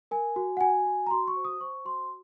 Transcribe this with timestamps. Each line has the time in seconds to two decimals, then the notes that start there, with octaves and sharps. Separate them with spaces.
0.11 A#4 G#5
0.36 F#4
0.57 F#5
0.61 F#4 G#5
0.86 F#4
1.07 A#5
1.11 F#4 C6
1.28 C#6
1.36 C5
1.45 D#6
1.61 C5 C#6
1.85 F#4 C6